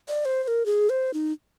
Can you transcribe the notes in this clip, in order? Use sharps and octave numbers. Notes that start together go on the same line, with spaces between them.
D5
C5
C5
A#4
G#4
C5
D#4